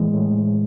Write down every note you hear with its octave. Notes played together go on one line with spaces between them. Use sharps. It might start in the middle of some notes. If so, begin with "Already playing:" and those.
Already playing: A2 E3 G#3
A2